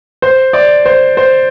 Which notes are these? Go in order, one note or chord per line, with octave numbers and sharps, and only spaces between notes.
C5
D5
C5
C5